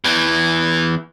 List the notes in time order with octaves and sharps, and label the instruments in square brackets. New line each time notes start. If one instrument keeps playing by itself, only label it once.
[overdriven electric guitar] E2 E3